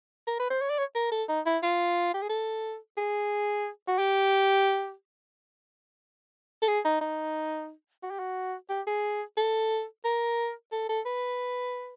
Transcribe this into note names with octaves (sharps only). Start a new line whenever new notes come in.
A#4
B4
C5
C#5
D5
C#5
A#4
A4
D#4
E4
F4
G4
G#4
A4
G#4
F#4
G4
A4
G#4
D#4
D#4
F#4
G4
F#4
G4
G#4
A4
A#4
A4
A4
B4